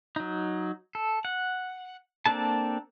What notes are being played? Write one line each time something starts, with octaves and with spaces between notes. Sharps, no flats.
F#3 D#4
A4
F#5
A#3 C4 D4 A4 A5